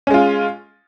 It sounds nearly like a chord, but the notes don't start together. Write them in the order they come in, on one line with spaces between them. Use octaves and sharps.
C#4 G#3 F4